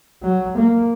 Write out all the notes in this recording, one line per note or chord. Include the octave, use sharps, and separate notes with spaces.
F#3
A#3